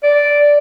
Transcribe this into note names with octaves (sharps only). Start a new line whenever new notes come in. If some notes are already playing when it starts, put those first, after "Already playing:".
D5